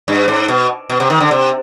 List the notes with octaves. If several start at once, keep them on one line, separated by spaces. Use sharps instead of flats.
G2
G#2
B2
B2
C3
D#3
D3
C3